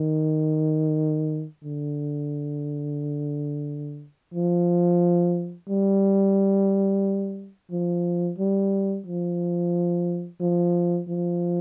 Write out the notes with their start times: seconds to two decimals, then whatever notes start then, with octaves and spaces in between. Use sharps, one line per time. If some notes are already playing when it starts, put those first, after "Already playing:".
Already playing: D#3
1.64 D3
4.34 F3
5.69 G3
7.71 F3
8.38 G3
9.06 F3
10.40 F3
11.08 F3